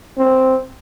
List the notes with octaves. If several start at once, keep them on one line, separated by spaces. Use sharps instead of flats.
C4